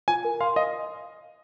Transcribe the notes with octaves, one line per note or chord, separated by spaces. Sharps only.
F4 G#5
A#4
F5 C6
D#5 F5